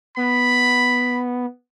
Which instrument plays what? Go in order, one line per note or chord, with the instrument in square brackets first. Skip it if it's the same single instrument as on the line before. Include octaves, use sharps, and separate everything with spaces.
[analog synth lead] B3 [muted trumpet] B5